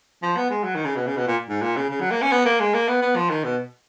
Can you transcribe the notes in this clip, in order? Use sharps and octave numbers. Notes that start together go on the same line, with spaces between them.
F3
B3
G#3
F#3
D#3
C#3
B2
C#3
B2
A#2
G#2
A#2
C#3
C#3
F#3
A#3
C#4
B3
A#3
G#3
A#3
B3
B3
F3
D#3
B2